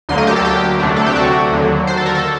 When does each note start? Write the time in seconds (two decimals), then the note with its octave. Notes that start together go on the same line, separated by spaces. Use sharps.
0.09 D2 D3 F#3 A#3 C6
0.18 D#5
0.27 G4
0.36 A4
0.45 G4
0.80 D2 C3 F#3 A3 D4
0.96 A4
1.06 G4
1.16 F#4
1.52 D#2 D3 F#3
1.87 C5
1.97 A4
2.06 A#4
2.15 A4